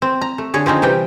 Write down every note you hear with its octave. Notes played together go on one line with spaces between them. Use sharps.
C4
A#5
A3
D3 G#4 C#5
F3 C4 C#4 D#4
C3 E3 G3 G5